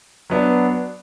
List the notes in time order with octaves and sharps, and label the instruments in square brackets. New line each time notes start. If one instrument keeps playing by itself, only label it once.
[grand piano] F#3 B3 D4